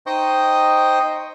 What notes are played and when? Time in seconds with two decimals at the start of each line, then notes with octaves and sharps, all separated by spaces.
0.06 D#4 C5 D#5 G5 C#6 D#6